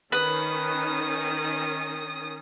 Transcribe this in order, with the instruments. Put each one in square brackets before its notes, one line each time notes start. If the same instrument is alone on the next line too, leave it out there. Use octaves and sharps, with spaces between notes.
[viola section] D#3 C#4 [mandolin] B4 [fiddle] D#6